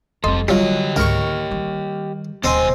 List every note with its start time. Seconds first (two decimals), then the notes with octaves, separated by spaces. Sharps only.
0.24 F1 G3 C4 A4 D#5 C6
0.48 D3 F#3 G3 F4 G4 D#5
0.96 C#2 G#2 A#4 C#6
1.51 D#3 G3
2.44 D1 B2 C4 D#5 G#5